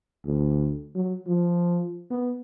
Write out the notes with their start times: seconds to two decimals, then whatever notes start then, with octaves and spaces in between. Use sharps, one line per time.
0.25 D2
0.95 F#3
1.27 F3
2.10 B3